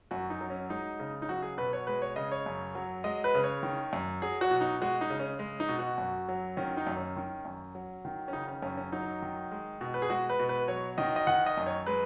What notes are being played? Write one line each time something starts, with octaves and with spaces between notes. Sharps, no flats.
F#2 F#4
D#4
F#3
C#4
G#3 D#4
C#3
D#4
F#3 F#4
G#4
B2 B4
C#5
G#3 B4
C#5
C#3 D#5
C#5
F#2
F#3
G#3 D#5
B4
C#3
C#5
D#3
F#2
F#3 G#4
F#4
B2
D#4
G#3 F#4
D#4
C#3
C#4
G#3
D#4
B2
F#4
F#2
F#3
D#3 C#4
D#4
F#2
C#4
D#3
F#2
F#3
D#3
C#4
C#3 D#4
C#4
F#2 C#4
C#4
F#3 D#4
D#3
G#3
B2
B4
G#4
G#3 F#4
B4
B2
B4
F#3 C#5
D#3 D#5
D#5
D#3 F#5
D#5
F#2
C#5
G#3 B4